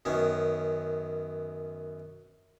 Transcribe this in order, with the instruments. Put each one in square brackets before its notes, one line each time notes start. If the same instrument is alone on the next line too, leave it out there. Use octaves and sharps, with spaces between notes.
[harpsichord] F#2 D#3 B3 C#4